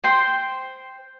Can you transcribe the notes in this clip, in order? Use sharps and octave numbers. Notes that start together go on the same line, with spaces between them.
C5 G5 C6